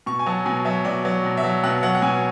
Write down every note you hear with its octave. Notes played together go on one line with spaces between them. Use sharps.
B2 C#6
G#5
F#3 A5
B2 G#5
F#3 E5
B2 D5
F#3
B2
E5
F#3
B2 F#5
F#3 F#5
F#5
B2 G#5